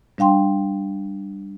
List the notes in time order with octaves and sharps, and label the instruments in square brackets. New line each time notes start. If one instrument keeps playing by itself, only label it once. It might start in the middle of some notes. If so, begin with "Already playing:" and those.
[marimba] G3 D4 F5 G5 C6